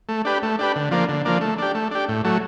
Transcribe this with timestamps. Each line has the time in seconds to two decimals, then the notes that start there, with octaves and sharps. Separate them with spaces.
0.09 A3
0.25 D4 G4 B4
0.43 A3
0.59 D4 G4 B4
0.76 D3
0.91 F3 A#3 D4
1.09 D3
1.25 F3 A#3 D4
1.41 A3
1.58 D4 G4
1.75 A3
1.91 D4 G4
2.09 A2
2.24 F#3 A3